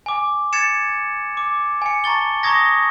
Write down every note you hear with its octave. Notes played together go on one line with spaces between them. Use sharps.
G#5 D6
G#6 A6 C#7 E7
D6
G#5 C#7
A5 A#5 C#6 A6 G7
A#5 C#6 D#6 G#6 A#6